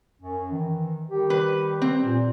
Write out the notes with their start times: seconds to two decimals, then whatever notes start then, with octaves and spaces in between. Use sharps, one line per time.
0.21 F#2 C#4
0.51 D#3 E3
1.11 D#3 G3 G4
1.30 B4
1.82 C4
2.04 A#2